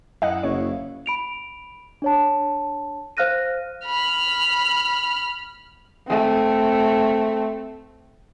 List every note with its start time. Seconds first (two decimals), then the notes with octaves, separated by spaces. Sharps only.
0.22 F#2 E4 D#5 F5 F#5
0.43 F#1 C#5
1.06 B5 D7 F7
2.02 D4 C#5 A5
3.17 C5 F5 F6 F#6 A#6 D#7
3.86 B5 F6
6.07 A3 C4